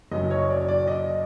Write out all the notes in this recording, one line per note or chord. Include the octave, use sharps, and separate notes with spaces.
F#1 F#2 C#3 F#3 D#5
C#5
D5
D5
D#5